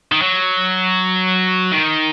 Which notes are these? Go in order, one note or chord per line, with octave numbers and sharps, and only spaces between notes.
D#3
F#3
D#3